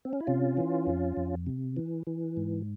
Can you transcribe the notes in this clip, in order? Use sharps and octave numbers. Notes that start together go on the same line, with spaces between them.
C4
C#4
E4
C3 C#4 F4
E3
F2
F2
C3
E3
E3
G#2